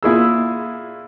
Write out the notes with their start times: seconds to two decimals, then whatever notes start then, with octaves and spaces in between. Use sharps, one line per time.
0.03 A#2 E4 G#4 E6